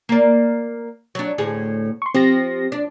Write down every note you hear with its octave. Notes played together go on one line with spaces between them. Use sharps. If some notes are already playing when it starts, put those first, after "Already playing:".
A#3 D5
F#3 D4
D2 A2 G#4
C6 C#6
F3 C4 G4 A#6
D4